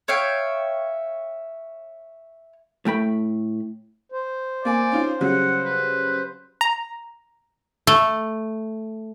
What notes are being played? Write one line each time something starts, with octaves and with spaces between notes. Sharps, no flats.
C#5 E5 F5 G5
A2 A3 G5 B5
C5
A#3 D5 G#5
C#4 D#4 F4
C#3 F#3 G3 F#5
B4
A#5
A3